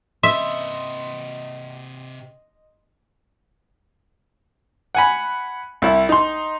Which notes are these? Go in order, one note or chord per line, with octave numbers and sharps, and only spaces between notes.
C3 B4 D#5 E5 C6
F#5 G#5 B5
C2 E4
D#4 C6